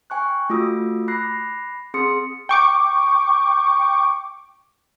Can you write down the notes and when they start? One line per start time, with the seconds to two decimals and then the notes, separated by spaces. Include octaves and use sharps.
0.10 G5 G#5 C#6 F#6
0.50 A3 F4 F#4 D#6 E6
1.08 B5 D6 F#6 A#6 C7
1.94 C4 G#4 C6 D#6 C#7
2.49 G5 C#6 D6